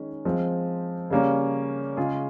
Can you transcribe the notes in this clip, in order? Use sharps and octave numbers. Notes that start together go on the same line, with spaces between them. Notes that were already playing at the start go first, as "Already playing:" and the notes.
Already playing: D#3 G#3 C#4 G#4
F3 G#3 C4
C#3 G3 A#3 C#4
C#3 G#3 C#4 F4 G#4